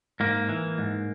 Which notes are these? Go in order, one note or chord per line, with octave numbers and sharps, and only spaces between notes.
G#2 A#3
E3
G#2